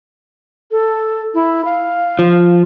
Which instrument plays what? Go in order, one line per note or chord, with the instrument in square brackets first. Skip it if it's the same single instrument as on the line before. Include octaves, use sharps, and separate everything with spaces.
[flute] A4
E4
F5
[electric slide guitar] F3